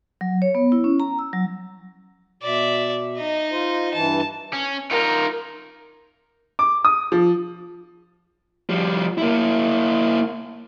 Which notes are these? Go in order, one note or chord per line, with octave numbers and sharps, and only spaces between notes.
F#3
C#5
B3
E4
C#4
A#5
E6
F#3
B2 D5 E5
D#4 D#5
F4 C5
G2 E3 A5
C#4
D#4 F4 A#4
D6
D#6
F3
F3 G3
A#3 E4